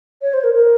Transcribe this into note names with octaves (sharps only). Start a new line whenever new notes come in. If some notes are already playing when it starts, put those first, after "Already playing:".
C#5
C5
A#4
A#4